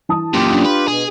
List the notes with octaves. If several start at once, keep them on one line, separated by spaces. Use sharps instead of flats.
E3 A5 D#6
F#2 A#2 F4 G4
D4
B4
B2 G#4